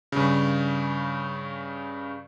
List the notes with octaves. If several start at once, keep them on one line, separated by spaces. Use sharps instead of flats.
G2 C#3